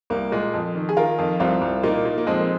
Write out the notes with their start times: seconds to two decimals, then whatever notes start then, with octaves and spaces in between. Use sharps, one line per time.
0.10 C2 A#3
0.32 A#2 G#3
0.54 F2
0.75 D#3
0.89 G#4
0.97 D#3 F4 A#4
1.18 F2
1.40 C2 C4 F4
1.62 C2
1.83 A#2 A#3 D#4
2.05 A#2
2.18 A#3
2.27 F2 G#3 C4